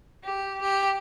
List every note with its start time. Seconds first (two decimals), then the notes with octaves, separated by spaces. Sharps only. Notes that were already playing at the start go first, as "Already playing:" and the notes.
0.23 G4
0.62 G4